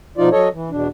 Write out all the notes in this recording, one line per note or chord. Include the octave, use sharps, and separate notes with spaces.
B2 F3 D#4 F4 D5
F#3 A4 C#5 D#5
E3
E2 B2 D4